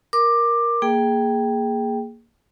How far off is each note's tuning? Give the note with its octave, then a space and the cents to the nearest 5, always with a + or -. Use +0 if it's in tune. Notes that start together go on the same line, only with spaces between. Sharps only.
A#4 +5 D6 +15
A#3 -5 G#4 +0 G5 +0